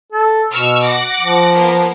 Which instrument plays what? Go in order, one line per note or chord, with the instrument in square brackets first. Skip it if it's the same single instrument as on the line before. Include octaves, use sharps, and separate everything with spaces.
[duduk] A4
[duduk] B2 [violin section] C#6 E6 F6
[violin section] F#5 D6 A#6
[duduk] F3
[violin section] A#3 B3 A#4